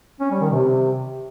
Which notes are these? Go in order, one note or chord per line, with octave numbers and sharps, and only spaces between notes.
C#4
G3
D#3
C3